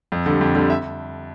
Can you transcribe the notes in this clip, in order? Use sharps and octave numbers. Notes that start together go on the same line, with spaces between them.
F2
D3 G3
F2
D3 G3
E5